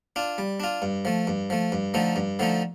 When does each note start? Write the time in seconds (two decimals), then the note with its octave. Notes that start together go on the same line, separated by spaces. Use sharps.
0.16 D4 F4
0.38 G3
0.60 D4 F4
0.82 G2
1.05 F3 A3
1.27 G2
1.50 F3 A3
1.72 G2
1.94 D3 F3 A3 D#4
2.16 G2
2.39 D3 F3 A3 D#4